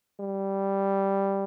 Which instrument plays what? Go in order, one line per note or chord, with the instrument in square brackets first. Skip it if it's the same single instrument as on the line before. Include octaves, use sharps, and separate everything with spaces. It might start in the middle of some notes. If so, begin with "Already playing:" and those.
[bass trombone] G3